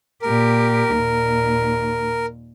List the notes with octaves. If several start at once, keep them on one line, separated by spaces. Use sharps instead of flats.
A#2 G4 A#4
D#2 A#2